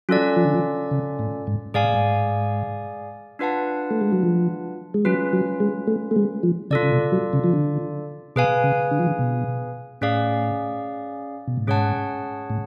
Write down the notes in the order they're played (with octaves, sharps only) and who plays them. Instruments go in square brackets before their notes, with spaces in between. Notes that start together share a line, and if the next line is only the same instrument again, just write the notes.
[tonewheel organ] F#3 [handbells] C#4 F4 A4 D5
[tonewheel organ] F3
D3
F3
C#3
A2
G#2
[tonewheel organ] G#2 [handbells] G#4 D5 F5 G#5
[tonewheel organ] A2
G#2
[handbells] D4 F4 B4 F#5 A5
[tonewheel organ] A3
G#3
F#3
F3
G#3
[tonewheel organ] F#3 [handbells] C#4 F4 B4
[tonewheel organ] F#3
G#3
A3
A3
G#3
F3
[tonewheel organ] C#3 [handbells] F4 A4 D5
[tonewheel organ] C#3
B2
F#3
C#3
F3
D3
[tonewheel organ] B2 [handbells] G#4 B4 F5 G#5
[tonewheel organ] C#3
D3
F3
D3
B2
[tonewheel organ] A2 [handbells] C#4 G#4 D5 F5
[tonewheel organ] B2
A2
[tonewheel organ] G#2 [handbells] C#4 G#4 C#5 F#5 A5
[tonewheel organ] A2